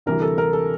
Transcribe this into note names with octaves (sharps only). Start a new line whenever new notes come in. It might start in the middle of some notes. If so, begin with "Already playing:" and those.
D2 C3 E3 G3 A#4
A4
A#4
A4